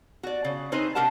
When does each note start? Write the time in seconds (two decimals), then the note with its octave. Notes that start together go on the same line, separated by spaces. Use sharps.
0.23 F#4 D5
0.44 C#3
0.72 C#3 C4 D#4 B4 C5
0.95 C3 D4 G4 A#4 F#5 A5